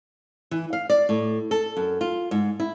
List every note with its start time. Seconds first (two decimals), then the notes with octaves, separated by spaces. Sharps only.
0.51 E3
0.73 F5
0.90 D5
1.09 A2
1.51 A4
1.77 F#2
2.01 F4
2.31 G#2
2.60 E4